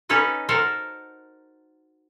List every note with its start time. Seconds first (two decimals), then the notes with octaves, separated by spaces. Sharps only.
0.09 C#4 D#4 A4 B4 D#5
0.49 F#4 A4 A#4 C5